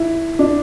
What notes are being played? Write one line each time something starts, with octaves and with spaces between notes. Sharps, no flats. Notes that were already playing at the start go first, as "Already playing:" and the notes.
Already playing: E4
D4